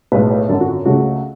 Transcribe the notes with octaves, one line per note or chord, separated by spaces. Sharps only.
B1 A2 G#3 B4
B4
G#1 F#2 D3 A4
F#4
C#2 C#3 F#3 A3 F#4